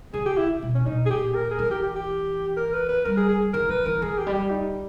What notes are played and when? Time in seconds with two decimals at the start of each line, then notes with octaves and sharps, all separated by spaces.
0.13 C#3 G#4
0.25 G4
0.37 E4
0.62 B2
0.74 C#4
0.86 B2 D#4
1.06 G#4
1.10 A#2 G4
1.34 A#4
1.51 G#4
1.59 E3 A#4
1.71 G4
1.83 G4
1.96 G4
2.57 A#4
2.73 B4
2.89 B4
3.04 G3 A#4
3.17 G#4
3.28 G#4
3.53 E3 A#4
3.69 E3 B4
3.85 E3 A#4
4.02 E3 G#4
4.18 G4
4.27 G3
4.34 G4
4.50 D#4